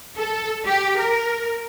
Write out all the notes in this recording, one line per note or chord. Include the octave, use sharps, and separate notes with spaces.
A4
G4
A#4